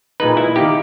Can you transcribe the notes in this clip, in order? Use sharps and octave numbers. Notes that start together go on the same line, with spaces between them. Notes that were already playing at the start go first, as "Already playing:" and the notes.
A#2 G#3 D#4 B4
E4
D#3 A#3 D#4 G4